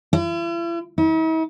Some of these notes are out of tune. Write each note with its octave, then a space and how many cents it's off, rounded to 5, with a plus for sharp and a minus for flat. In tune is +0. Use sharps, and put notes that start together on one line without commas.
E4 +45
E4 -45